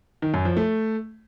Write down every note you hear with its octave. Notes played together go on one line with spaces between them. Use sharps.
D#3
F#2
F3
A3